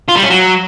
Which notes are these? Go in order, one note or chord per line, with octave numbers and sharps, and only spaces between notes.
F4
G3
C#4
F#3